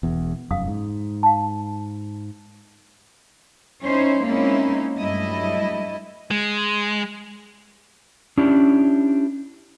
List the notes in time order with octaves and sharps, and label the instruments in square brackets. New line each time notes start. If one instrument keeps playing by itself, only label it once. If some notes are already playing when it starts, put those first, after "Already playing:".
[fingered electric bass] E1 E2
[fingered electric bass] F1 F#2 [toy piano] F5 D#6
[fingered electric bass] G#2
[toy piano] F5 A5
[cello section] C#4 D#4 E4 C5 C#5
G#3 A#3 C4 C#4 D#4 E4
G2 F#3 G3 A3 E4 D#5
[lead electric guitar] G#3
[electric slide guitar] C#4 D4 E4 G4